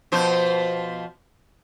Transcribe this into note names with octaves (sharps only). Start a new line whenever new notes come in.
B2 F3 C5